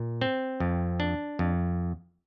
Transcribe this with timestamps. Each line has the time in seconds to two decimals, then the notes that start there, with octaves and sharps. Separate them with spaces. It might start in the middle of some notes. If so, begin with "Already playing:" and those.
Already playing: A#2
0.21 C4
0.60 F2
1.00 D4
1.39 F2